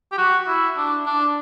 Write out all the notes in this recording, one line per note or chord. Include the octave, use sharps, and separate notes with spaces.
G4
F#4
E4
D4
D4